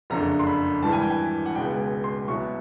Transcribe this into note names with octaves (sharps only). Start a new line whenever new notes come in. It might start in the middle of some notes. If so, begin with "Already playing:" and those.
F#1 F2 D3 A#5
C6
B5
G#1 G2 E3 A5
G#5
G5
G#5
F#5
C#2 B2 G#3 G5
G#5
G5
C6
C2 B2 F#3 C#6